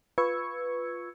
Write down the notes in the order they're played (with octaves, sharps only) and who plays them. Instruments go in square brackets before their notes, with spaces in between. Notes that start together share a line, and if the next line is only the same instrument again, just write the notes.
[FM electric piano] F4 B4 C#6 E6 G#6 C#7